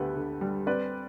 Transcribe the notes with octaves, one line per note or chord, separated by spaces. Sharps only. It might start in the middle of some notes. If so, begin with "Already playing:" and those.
Already playing: D2 B3 G4 A4 B4
D3
G3
C4 B4 D5